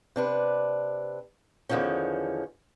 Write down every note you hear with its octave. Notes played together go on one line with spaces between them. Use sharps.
C3 D4 B4
E2 D3 D#3 F3 C#4